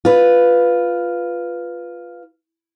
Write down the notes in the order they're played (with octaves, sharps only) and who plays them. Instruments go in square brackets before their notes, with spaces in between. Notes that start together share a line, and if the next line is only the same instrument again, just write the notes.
[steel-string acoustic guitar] F4 B4